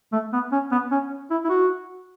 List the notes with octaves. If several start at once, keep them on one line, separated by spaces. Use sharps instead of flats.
A3
B3
C#4
B3
C#4
E4
E4
F#4